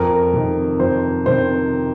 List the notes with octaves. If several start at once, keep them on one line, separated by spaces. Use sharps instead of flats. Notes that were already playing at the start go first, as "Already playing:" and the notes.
Already playing: F2 A#4
C3 D#3
F2 C5
C3 D#3 C5